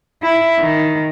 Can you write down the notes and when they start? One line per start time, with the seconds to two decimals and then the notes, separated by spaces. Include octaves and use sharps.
0.22 E4
0.59 D#3